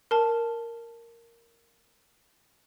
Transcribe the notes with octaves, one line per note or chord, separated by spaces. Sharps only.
A#4 A5